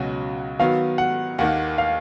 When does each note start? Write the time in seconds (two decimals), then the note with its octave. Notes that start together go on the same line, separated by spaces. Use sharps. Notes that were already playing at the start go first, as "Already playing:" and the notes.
Already playing: C#2 B2 F#3 C#4 F#4
0.59 D#3 F#3 B3 F5
0.98 F#5
1.38 D#2 D#3 A#3 F#5
1.78 F5